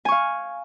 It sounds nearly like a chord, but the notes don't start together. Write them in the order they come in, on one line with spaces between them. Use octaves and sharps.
G#5 C#6 F5